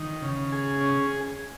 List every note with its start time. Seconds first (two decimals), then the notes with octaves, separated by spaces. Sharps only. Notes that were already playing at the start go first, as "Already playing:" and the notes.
Already playing: D#3
0.22 C#3
0.52 G#4
0.81 C#4